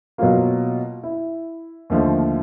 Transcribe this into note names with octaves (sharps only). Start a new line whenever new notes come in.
B2 F#3 A#3 F4
E4
D#2 D3 F3 A3